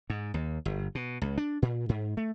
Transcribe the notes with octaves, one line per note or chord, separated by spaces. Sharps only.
G#2
D#2
G1
B2
C#2
D4
A#2
G#2
A3